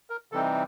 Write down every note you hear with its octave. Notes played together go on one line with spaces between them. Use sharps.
A#4
C3 E3 G3 C4 D#4 A4